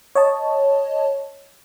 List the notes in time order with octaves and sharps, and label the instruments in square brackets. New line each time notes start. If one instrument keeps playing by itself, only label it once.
[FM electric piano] C#5 D#5 A5